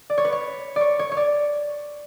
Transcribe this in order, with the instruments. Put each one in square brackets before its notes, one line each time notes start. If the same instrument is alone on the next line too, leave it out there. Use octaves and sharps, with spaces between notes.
[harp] D5
C#5
B4
C#5
C#5 D5
C#5
C#5
D5